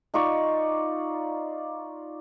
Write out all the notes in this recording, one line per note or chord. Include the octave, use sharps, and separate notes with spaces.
D#4 F4 D5 C#6